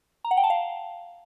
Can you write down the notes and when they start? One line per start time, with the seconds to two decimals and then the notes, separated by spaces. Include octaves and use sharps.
0.25 A#5
0.31 F#5
0.37 G5
0.44 A5
0.50 F5